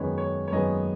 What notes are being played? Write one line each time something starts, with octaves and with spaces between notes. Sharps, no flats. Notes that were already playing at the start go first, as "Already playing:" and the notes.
Already playing: F#2 D#3 G#3 B3 C#5
C#5
C#5
F#2 D#3 G#3 B3 D#5